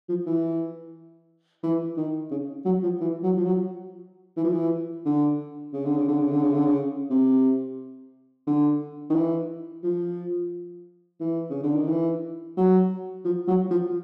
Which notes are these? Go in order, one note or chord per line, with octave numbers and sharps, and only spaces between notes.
F3
E3
E3
D#3
C#3
F#3
F3
E3
F#3
F3
F#3
E3
F3
E3
D3
C#3
D3
C#3
D3
C#3
D3
C#3
D3
C#3
C3
D3
D#3
E3
F3
E3
C#3
D3
D#3
E3
F#3
F3
F#3
F3